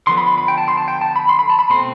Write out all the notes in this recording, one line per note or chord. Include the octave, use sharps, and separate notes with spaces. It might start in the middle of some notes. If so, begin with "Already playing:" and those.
D3 F3 B3 C6
B5
C6
B5
G5
A5
C6
A5
G5
A5
B5
C6
B5
A5
B5
B2 A3 C4 C6